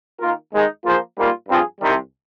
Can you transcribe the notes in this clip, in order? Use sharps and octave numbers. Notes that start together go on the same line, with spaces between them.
D#3 A#3 F4 A#4
D#2 D#3 G#3 D#4
F3 A#3 F4 G#4 C5
G#2 G3 A#3 F4
G2 F3 C4 F4 G#4
C2 C3 D#3 G3